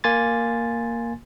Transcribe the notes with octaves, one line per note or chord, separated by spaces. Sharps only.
A#3 G#5 C6 A6